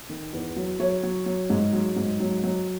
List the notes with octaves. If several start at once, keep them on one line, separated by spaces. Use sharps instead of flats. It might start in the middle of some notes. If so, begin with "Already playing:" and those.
D#3
E2
F#3
F#3 C#5
F#3
F#3
G#2
F#3
G#2
F#3
F#3